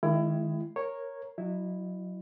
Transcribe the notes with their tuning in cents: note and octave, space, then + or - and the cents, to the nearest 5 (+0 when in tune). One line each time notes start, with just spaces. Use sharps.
D#3 +0 G#3 +30 E4 +25
A#4 +5 C#5 -10 A#5 +0
F#3 -5 E4 +0 D#5 -35